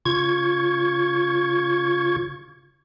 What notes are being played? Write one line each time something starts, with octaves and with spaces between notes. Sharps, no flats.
C#3 F4 C#6 G#6